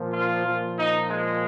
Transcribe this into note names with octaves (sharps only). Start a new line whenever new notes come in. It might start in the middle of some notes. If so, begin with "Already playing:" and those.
Already playing: A#2 F3
F4
A#2 F3
D#4
G#3